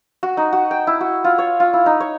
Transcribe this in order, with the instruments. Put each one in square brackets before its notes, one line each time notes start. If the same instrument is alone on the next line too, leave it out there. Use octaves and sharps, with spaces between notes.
[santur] F#4
D#4
F#4
G5
E4
F#4
F4
C#5
F4
E4
D#4
C#5